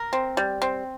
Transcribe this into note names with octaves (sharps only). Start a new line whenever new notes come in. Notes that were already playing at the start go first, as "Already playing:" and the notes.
Already playing: A#4
C4
G3
C4